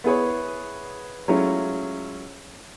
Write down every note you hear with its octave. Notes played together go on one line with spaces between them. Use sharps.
B3 E4 G#4 B4 C#5
F#3 G#3 A3 C#4 E4 F4